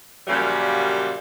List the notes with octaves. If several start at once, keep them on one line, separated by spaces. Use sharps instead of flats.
F#2 A#2 C#3 F3 G3